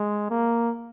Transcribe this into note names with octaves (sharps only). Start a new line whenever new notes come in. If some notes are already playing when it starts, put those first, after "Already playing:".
Already playing: G#3
A#3